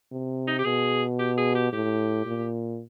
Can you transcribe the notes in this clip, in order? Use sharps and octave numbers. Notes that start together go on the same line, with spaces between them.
C3
D#4
G4
B2 G#4
G4
G#4
G4
A2 G4
A#2